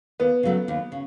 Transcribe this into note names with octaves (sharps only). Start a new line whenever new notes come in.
D#2 B3
C#3 F#3 A3
D#2
C#3